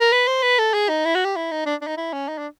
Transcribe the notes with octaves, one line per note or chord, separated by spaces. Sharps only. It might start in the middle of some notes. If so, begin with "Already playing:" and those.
A#4
B4
C5
B4
A4
G#4
D#4
E4
F#4
G4
E4
D#4
D4
D4
D#4
E4
C#4
D#4
D4